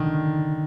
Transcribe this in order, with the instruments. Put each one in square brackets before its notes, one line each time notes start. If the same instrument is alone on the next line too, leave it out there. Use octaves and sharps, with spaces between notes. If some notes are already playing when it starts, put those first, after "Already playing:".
Already playing: [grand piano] D3 D#3